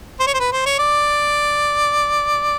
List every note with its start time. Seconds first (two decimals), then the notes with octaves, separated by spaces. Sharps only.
0.20 C5
0.27 C#5
0.34 C5
0.40 B4
0.53 C5
0.66 C#5
0.79 D5